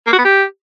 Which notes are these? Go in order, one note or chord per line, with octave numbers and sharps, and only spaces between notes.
A#3
F#4
B3
G4